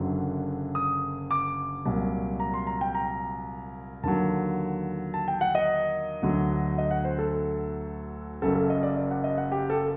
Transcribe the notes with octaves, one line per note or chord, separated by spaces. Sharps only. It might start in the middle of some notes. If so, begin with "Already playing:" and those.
Already playing: F#1 F#2 D3 F#3
D#6
D6
C2 A#2 F#3
A#5
C6
A#5
G5
A#5
D#2 D3 F#3 A5
A5
G5
F#5
D#5
D2 D3 F#3
D#5
F#5
C5
A4
F#1 F#2 F#3 A4
A4
D#5
D5
D5
F#5
D#5
F#5
G4
A4